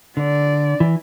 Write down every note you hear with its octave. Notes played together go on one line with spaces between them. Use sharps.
D3 D5
E3